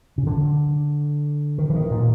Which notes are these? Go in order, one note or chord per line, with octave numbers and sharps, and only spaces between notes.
C#3
D3
D#3
E3
D#3
A#2